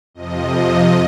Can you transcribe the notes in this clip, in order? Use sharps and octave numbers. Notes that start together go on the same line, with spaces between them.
F2 C3 F3 D#5